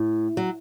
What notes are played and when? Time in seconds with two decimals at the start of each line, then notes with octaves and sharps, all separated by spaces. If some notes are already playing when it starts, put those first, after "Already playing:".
Already playing: A2
0.37 F#3